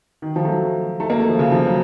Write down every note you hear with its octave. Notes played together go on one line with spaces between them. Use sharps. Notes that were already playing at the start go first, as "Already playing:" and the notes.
D#3
F3
A3
F#3
A3
A#3
A3
F3
C#3
F3
F#3